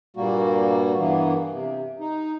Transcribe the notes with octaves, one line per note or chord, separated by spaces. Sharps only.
G2 A#2 G3 A#3 F#4
G2 E3 A#3 B3
C3
D#4